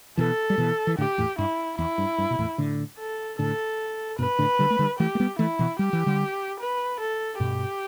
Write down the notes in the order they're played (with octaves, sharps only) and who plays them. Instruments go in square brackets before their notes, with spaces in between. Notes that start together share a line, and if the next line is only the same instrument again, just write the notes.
[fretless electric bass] B2 E3 [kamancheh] A4
[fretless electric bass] G3
B2 E3
E3
[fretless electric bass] A2 D3 [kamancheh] G4
[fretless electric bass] E2 A2
[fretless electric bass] G2 [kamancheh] E4
[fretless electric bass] E2 [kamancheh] E4
[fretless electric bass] G2
G2
B2
E2 A2
A2 D3
[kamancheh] A4
[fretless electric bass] A2 D3 [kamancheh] A4
[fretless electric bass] G2 B2 [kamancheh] B4
[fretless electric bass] A2 D3
D3 G3
A3
D3 G3
[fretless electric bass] E3 A3 [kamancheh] G4
[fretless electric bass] A3
G3 B3
[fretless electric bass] E3 A3 [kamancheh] E4
[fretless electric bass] B2 E3
[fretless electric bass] G3 [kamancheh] G4
[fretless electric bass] E3
D3 G3
[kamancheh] B4
A4
[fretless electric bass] G2 B2 [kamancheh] G4